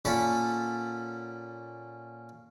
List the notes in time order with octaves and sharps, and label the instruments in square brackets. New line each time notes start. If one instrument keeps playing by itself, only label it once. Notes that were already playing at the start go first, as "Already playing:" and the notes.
[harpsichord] A#2 C#4 A4 F#5 B5